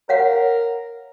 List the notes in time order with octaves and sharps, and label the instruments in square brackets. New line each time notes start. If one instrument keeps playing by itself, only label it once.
[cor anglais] A#4 [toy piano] C#5 F5 F#5